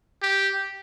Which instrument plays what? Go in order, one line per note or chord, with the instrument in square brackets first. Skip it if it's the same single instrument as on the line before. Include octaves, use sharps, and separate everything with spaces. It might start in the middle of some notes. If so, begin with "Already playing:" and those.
[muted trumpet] G4